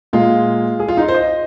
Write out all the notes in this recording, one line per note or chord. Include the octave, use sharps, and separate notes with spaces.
A#2 G#3 F4
G#4
F4
D#4
F4
C5
D#5